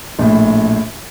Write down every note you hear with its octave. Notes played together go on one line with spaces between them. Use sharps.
A#1 A2